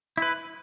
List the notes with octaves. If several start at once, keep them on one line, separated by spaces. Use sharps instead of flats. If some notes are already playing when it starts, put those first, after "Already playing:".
E4 B4